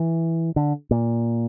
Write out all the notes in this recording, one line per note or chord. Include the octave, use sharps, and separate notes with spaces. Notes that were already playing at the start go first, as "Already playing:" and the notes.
Already playing: E3
D3
A#2